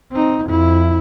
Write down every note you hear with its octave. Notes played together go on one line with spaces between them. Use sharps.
C4 D#4
F2 E4